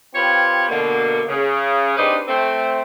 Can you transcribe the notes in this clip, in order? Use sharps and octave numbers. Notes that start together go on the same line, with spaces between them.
C4 F4 G4 B4 C#5
B2 D3 A#3
C#3
C4 D4 D#4 G4 B4 C5
A3 C4